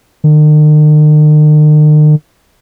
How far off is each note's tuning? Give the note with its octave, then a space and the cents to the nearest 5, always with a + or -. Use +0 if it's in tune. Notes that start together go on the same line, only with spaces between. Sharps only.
D#3 -45